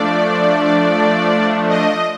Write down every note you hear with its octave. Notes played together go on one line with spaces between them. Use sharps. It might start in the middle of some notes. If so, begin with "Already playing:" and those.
Already playing: F3 A3 D4 D5
D#5